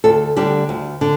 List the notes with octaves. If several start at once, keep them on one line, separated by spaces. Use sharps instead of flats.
D2 A4
D3 G3 G4
D2
D3